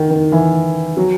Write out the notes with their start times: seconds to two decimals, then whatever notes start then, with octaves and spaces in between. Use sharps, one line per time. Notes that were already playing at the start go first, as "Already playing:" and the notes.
Already playing: D#3
0.10 D#3
0.32 E3
0.97 F#3